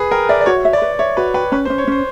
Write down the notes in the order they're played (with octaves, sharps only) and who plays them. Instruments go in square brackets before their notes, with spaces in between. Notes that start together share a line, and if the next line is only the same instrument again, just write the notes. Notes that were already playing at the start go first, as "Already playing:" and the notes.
Already playing: [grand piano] G#4 B4
[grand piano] A#4 [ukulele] G5
[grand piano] D5 [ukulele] E5
[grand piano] D5
[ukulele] F#4 [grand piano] C#5
[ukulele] E5
[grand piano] D5
[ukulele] B4
[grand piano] C#5 [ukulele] E5
[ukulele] F#4 [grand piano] B4
[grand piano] B4 [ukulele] G5
[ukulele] C#4 [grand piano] B4
[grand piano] C5
[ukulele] C#4
[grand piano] C#5
[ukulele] C#4 [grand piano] C5